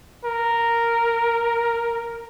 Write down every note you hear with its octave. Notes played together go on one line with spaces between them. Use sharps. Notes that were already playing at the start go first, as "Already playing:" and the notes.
A#4